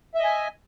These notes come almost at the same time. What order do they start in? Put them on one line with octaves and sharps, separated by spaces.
E5 D#5 G#5